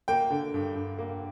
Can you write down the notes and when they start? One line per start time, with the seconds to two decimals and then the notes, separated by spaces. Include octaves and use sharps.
0.08 A#3 G5
0.30 D3
0.54 G2
0.75 G2
0.99 A#3